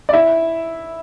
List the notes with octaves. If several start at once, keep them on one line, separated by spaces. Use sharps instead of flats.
D5
E4 E5